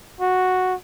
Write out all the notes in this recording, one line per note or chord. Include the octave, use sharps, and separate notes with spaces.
F#4